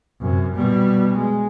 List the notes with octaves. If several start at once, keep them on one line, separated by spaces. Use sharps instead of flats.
F#2 C3
B2 G3
G#3